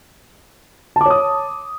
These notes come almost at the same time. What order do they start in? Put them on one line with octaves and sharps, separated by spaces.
A5 D6 C#5 D#6